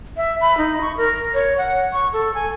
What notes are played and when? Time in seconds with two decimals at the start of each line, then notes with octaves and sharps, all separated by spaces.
0.17 E5
0.41 B5
0.58 D#4
0.81 C#6
0.97 A#4
1.34 C#5
1.58 F#5
1.93 C#6
2.13 A4
2.34 G#5